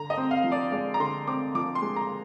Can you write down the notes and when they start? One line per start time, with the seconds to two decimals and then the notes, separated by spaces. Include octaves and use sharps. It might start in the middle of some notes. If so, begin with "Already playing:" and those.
Already playing: D3 A#5
0.10 D#5
0.17 C4
0.31 F5
0.44 F3
0.52 D5
0.72 G#3 D5
0.94 A#5
1.00 D3 C6
1.28 C4 D6
1.55 F3 D6
1.75 C6
1.82 G#3
1.96 A#5